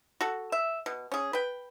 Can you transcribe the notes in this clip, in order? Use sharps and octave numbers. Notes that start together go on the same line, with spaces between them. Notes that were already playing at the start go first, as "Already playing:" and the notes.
F#4 A4
E5
B2
C#4 G#4
B4 G5